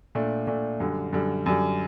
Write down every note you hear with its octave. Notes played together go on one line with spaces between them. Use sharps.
A#2 A3 D4
A#2 A3 D4
F#2 D3 G3
F#2 D3 G3
F#2 D3 G3